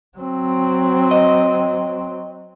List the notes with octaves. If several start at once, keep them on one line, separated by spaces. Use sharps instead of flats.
F#3 C4
D#5